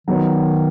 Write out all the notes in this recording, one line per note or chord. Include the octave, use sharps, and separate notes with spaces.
D#3 F#3 B3 D#4 F#4 C#5